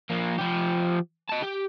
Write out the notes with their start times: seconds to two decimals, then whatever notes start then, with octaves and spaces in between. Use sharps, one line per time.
0.10 F3 A#3
0.38 F3 G4
1.29 D#5 A5
1.42 G4